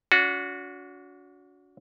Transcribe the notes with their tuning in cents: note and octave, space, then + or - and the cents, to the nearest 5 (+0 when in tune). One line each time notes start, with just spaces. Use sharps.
D4 -45 F#4 -20